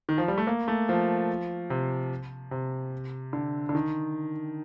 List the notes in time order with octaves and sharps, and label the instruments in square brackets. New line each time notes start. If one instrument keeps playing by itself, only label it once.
[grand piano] D#3
F3
G3
A3
A#3
A3
F3
C3
C3
D3
D3
D#3